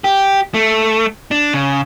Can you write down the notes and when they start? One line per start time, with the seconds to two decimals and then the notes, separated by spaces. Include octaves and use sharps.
0.04 G4
0.54 A3
1.31 D4
1.53 C#3